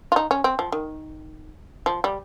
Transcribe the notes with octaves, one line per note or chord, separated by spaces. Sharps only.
F4
D#4
C#4
C4
F3
D#3
F3
G3